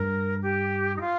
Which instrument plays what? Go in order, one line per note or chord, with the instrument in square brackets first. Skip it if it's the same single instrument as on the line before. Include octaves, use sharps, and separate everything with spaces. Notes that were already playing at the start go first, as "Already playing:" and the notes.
Already playing: [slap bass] G2 [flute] A#4
[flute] G4
D#4
F4